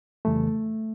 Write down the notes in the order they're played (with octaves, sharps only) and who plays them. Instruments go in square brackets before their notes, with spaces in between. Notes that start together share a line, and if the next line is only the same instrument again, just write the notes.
[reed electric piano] F2 C#3 E3 G3 A3